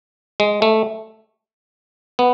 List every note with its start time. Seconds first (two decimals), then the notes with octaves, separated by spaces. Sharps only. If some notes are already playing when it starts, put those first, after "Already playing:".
0.40 G#3
0.62 A3
2.19 B3